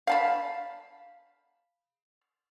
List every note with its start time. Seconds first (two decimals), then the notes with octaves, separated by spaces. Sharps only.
0.07 F5 A5 B5